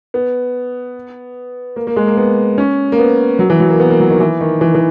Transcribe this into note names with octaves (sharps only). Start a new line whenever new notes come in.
B3
A#3
A#3
G#3
A#3
B3
C#4
A#3
B3
F#3
E3
F#3
A#3
B3
A#3
F#3
D#3
E3
D#3
E3
E3